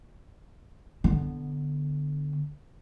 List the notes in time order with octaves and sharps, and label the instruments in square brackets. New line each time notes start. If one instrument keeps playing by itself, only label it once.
[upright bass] D3 B3